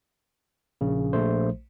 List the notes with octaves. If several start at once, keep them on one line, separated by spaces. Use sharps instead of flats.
A#1 C#3
A#1 A3 C5